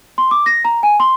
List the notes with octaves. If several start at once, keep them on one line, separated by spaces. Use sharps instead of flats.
C6
D6
A#6
A#5
G#5
C6